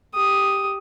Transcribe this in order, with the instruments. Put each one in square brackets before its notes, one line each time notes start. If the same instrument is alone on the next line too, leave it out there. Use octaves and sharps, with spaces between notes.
[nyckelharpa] G4 D#6